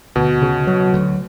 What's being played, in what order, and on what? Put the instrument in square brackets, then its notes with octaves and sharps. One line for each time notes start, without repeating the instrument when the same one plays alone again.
[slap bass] D2 [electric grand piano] B2
[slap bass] C#3
F#3
D2